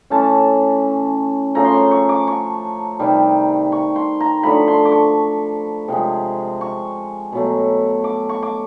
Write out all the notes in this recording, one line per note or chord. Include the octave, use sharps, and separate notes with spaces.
E3 A3 C#4 A5
C#3 F3 A3 A#5
C6
C#6
C#6
D6
C#6
C3 D#3 G3
C#6
C6
A#5
D3 F3 A3 B5
C6
D6
C#6
C3 F3 G#3
C#6
B2 F#3 A3
D6
C#6
D6